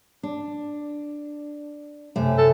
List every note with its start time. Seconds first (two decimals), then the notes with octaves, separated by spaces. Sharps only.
0.23 D4
2.16 F#2 C3 A3
2.38 A4